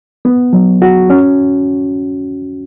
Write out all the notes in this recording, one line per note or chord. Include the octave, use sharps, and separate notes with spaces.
B3
F#3
F#4
C#4